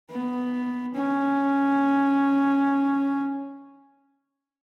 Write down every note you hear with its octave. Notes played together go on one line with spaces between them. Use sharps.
B3
C#4